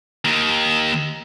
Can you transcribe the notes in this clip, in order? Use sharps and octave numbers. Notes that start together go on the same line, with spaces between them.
D#2 D#3